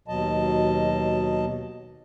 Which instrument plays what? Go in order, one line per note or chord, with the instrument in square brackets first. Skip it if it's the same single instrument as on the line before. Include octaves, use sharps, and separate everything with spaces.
[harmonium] D#2 B2 F#3 D#5 A5